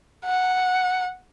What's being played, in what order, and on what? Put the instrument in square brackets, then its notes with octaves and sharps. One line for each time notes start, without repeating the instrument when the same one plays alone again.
[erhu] F#5